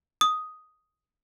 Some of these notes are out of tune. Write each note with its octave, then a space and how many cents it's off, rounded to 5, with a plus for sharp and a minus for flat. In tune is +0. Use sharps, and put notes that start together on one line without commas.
D#6 +5